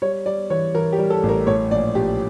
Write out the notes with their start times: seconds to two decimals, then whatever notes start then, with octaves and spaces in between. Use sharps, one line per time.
0.02 G3 C#5
0.26 G3 D5
0.50 E3 C#5
0.74 E3 A#4
0.93 G4
0.98 G3
1.10 A4
1.23 A1
1.29 A#4
1.47 A2 C#5
1.71 A#1 D5
1.95 A#1 G4